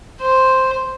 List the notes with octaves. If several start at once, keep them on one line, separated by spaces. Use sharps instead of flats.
C5